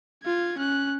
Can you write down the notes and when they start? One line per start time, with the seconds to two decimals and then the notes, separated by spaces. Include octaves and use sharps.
0.24 F4 G#6
0.58 C#4 F#6